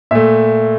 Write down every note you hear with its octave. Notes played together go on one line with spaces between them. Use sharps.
A#2 A3 E5